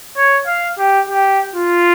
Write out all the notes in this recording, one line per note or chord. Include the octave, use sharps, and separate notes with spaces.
C#5
F5
G4
G4
F4